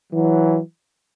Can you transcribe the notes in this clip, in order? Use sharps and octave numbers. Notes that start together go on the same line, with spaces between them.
E3 F#3